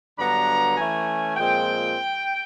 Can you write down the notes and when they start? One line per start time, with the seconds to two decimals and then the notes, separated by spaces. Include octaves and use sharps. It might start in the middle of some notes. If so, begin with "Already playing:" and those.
0.18 G2 D3 F#3 B3 D4 A#5
0.77 E3 A3 C#4 G#5
1.37 A#2 F3 G#3 C4 G5